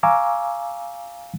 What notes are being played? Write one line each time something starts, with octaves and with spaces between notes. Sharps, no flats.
F5 G#5 A#5 C#6 D6 E6